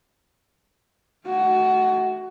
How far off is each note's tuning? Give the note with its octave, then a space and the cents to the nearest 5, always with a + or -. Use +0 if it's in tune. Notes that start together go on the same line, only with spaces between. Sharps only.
A3 -20 F#4 +15